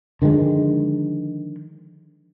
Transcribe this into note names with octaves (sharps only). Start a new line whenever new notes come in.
D3 D#3 F3 G#3